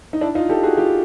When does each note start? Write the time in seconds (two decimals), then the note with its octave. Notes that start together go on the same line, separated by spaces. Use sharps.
0.13 D#4
0.21 D4 E4
0.35 D#4 F4
0.49 G4 A4
0.63 F#4 G#4
0.77 F4 G4